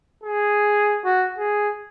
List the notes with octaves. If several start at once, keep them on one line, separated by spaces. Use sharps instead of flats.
G#4
F#4
G#4